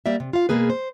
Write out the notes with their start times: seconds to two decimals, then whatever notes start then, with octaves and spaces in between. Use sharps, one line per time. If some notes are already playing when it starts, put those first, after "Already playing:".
0.06 G3 A#3 D5 E5
0.20 C3
0.33 F4 F5
0.49 B2 F3 G#3 A#3 G#4 B4
0.70 C5